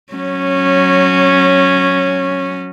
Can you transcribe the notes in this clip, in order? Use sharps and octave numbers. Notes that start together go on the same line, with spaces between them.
F#3 C#4